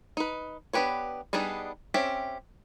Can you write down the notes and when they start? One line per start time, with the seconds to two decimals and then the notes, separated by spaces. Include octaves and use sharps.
0.17 D#4 B4
0.73 B3 D4 G4 B4 C#5
1.33 G3 B3 D4 D#4 G#4
1.94 C4 C#4 G4 E5